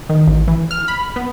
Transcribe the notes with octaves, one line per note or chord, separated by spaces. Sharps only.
D#3
A1
E3
F6
B5
B3